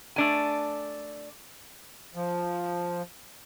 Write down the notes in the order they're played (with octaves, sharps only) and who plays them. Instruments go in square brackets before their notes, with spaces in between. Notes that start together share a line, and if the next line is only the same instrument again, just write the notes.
[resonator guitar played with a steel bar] A3 D4 G#5
[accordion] F3